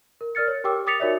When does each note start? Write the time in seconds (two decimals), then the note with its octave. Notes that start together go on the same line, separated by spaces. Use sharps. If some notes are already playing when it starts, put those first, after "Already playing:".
0.21 A#4
0.35 A#4 D5 F6 A6 C#7
0.47 C#5
0.64 G4 A#4 G5 D6 E6
0.87 D6 D#6 A6 B6 C#7 F7
1.00 D#4 F#4 A#4 C#5 D5 E5